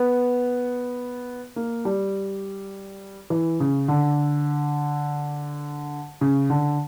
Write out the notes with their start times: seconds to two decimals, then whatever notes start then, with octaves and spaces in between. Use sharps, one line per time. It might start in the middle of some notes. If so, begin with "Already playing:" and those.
Already playing: B3
1.56 A#3
1.85 G3
3.30 E3
3.60 C#3
3.88 D3
6.21 C#3
6.50 D3